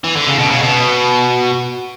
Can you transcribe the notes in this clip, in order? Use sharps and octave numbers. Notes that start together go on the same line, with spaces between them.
E3
D3
C#3
B2
C#3
B2